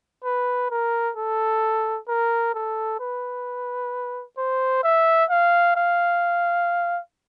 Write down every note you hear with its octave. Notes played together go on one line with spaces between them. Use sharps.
B4
A#4
A4
A#4
A4
B4
C5
E5
F5
F5